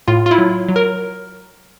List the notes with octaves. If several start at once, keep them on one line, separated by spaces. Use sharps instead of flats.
A2 F4
F4
E4
F#3
F#3
A#4